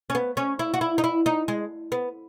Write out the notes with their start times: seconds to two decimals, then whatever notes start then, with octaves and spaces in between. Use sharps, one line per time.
0.10 C#4
0.15 B3
0.37 C#4
0.59 E4
0.74 F#4
0.81 E4
0.98 D#4
1.04 E4
1.26 D#4
1.48 G#3
1.92 B3